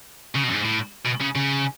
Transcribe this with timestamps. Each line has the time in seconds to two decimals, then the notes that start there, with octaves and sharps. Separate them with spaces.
0.35 C#3
0.44 B2
0.49 F#2
0.55 G#2
0.65 A2
1.05 B2
1.21 C#3
1.36 C#3